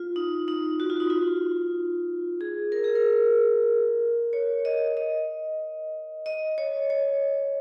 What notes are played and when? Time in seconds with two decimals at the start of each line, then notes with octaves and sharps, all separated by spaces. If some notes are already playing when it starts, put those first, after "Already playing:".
Already playing: F4
0.16 D#4
0.48 D#4
0.80 F#4
0.90 F4
1.00 D#4
1.10 F4
2.41 G#4
2.72 A#4
2.84 G#4
2.95 A#4
4.33 C#5
4.65 D#5
4.97 D#5
6.26 D#5
6.58 C#5
6.90 C#5